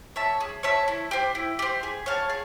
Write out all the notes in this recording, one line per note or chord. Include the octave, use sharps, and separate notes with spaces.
C#5 E5 A5
G#4
C#5 E5 A5
E4
G4 C5
E4
G4 C5
G#4
C#5 F5 A5
G#4